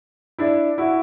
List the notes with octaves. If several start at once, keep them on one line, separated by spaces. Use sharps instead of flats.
D4 E4
E4 F#4